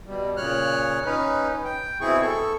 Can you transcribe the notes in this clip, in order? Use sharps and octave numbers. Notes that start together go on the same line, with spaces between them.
B2 G3
A#2 C#3 C#5 F6 F#6
C#4 D#4 B4
G5
B2 C4 E4 G#4 C#6
A4 C#6